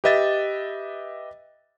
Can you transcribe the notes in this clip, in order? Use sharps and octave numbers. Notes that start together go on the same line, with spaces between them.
G4 B4 D#5 E5 A6